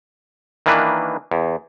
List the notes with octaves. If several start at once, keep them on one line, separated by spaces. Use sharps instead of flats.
D#3 E3 A#3 D4 B4
E2